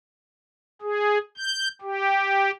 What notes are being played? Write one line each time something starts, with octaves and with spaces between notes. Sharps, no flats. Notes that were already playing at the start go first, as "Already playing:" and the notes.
G#4
G6
G4